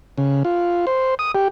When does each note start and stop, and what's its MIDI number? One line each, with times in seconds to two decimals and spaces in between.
0.18 0.43 49
0.45 0.86 65
0.87 1.15 72
1.19 1.32 87
1.35 1.48 67